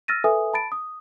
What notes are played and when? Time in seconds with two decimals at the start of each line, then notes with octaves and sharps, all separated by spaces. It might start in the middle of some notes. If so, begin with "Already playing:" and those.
0.08 E6 F6 A6 A#6 D#7
0.24 A4 B4 E5 G#5 D#6
0.53 A5 B5 A6 D7
0.72 D#6